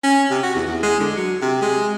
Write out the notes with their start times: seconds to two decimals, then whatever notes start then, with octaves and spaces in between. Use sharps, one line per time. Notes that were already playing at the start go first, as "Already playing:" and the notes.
0.03 C#4
0.30 C3
0.43 F#4
0.55 E2
0.67 E2
0.83 G#3
1.00 D3
1.17 F#3
1.42 C3
1.61 G#3